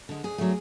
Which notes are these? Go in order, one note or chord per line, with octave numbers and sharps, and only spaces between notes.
D3 G#3
D2 G#4
D3 F#3 A3